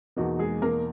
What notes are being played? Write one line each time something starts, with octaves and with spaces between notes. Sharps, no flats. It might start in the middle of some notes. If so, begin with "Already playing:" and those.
E2 B2 A#3 D#4 F#4
G#3 G#4
A#3 A#4